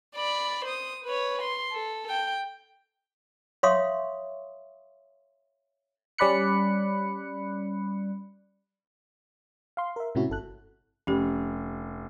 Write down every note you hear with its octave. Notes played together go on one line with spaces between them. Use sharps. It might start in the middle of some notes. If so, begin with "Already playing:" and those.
D5 B5
C5 D#6
B4 C#5
C6
A4
G5
C#5 E5 F5 C6 C#6 D#6
G3 C#4 D5 B5 F#6 C#7
F5 C6
A#4 E5
A2 C3 G#3 C#4 E4 F#4
G1 A4 F#6
F1 C#4 G4